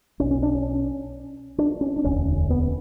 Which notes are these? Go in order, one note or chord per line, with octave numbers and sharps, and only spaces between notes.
B1 B2 C#4
C#4
D4
C#4
D4
C#4
D4
E1 D2 D3 C#4
B3